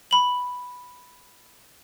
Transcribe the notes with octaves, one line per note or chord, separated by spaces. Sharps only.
B5 F#7